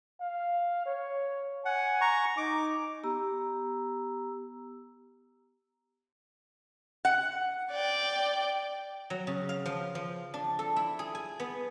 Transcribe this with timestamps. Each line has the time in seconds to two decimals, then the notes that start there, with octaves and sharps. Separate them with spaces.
0.21 F5
0.86 C#5
1.65 F#5 G#5
2.01 A#5 C#6
2.37 D#4 D6
3.04 B3 G4 A#5 E6
7.05 F#5
7.72 D5 G5
9.10 F#3
9.27 C#3
9.49 F5
9.66 F3
9.95 F3
10.34 D4
10.59 A4
10.76 E4
10.99 G#4
11.15 G#5
11.40 B3